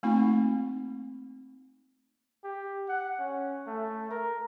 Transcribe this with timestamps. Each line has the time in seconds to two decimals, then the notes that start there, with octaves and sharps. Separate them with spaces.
0.03 A3 A#3 C4 D#4 F4
2.44 G4
2.89 F#5
3.19 C#4
3.67 A3
4.11 A#4